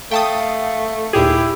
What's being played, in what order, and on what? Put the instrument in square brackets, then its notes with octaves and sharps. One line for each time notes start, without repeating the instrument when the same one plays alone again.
[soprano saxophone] A3 [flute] F5 [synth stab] G5 A5 D#6
[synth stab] D#2 A#2 G#4 [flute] E4 [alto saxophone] G4